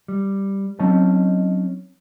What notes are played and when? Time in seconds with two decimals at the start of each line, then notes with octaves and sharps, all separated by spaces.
0.08 G3
0.79 F#3 C4 C#4 D#4 D#5 A5